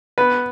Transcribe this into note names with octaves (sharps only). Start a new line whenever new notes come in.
B3 B4